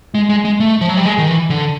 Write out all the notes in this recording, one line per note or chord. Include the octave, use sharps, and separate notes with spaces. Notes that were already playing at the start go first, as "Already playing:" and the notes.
G#3
G#3
G#3
A3
F3
F#3
G3
G#3
D#3
E3
D3